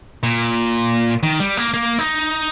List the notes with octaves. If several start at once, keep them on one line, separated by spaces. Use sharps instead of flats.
A#2
D#3
G3
A#3
A#3
D#4